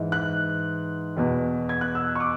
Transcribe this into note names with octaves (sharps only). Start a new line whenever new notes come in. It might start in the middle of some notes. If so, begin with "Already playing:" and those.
Already playing: G#2 E3
F#6
E2 B2
G#6
F#6
E6
C#6
D6